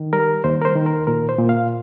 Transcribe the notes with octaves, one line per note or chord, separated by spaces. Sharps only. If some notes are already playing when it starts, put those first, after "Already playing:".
Already playing: D#3
G3 A#4
D#2 C5
A#4
C5
D#3
A#4
A#2 A#4
C5
A#2
F5